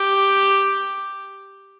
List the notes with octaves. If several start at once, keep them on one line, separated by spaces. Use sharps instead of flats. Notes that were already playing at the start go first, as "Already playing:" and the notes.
Already playing: G4